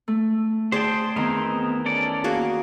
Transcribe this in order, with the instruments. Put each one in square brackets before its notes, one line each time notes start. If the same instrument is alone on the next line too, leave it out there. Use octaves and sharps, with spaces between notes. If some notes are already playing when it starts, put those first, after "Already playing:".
[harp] A3
[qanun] G#4 D5 A5 [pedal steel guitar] C5 G5
[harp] E2 D#3 [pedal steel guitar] B3 C4 D#4
[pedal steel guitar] C#4 A4 D5
[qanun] A#3 F#4 G#4